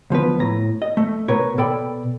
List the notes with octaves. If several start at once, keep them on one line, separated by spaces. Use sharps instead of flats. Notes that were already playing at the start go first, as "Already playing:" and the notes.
D2 F3 B3 B4
A2 A#5
D#5
A3
B2 A#4 B4 C#5
B2 A4 D5 G5 B5